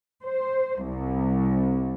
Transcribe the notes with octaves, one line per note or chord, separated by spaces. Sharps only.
C5
C2